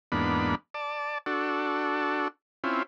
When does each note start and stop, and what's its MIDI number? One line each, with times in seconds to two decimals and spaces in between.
0.12 0.55 40
0.12 0.55 44
0.12 0.55 58
0.12 0.55 59
0.12 0.55 62
0.12 0.55 83
0.74 1.18 74
0.74 1.18 81
1.26 2.28 62
1.26 2.28 66
1.26 2.28 69
2.64 2.83 60
2.64 2.83 61
2.64 2.83 64
2.64 2.83 65